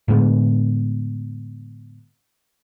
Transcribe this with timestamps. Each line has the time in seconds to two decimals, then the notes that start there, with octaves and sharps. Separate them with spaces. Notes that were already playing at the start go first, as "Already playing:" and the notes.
0.08 A2 D3 G#3 B3